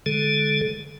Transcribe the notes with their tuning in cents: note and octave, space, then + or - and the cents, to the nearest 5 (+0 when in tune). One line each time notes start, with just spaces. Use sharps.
D3 +0 G#3 +0 A4 -30